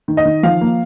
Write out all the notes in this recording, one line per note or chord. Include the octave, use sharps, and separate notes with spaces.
D#3
D#5
D#3
F3 F5
A#3